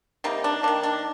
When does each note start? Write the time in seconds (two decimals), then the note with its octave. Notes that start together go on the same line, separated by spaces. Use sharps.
0.24 C3 G3 A#3 D#4
0.44 D4
0.63 D#3 A#3 D4
0.83 D4